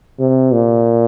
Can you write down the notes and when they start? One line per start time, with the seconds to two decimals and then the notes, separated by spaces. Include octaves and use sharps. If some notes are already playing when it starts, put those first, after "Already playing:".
0.19 C3
0.53 A#2